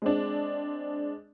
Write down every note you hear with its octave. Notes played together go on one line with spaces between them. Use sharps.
G#3 C4 D4